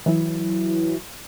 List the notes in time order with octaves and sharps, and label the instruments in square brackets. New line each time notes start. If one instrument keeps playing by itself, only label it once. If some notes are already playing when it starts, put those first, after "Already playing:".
[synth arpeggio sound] E3 F#3 E4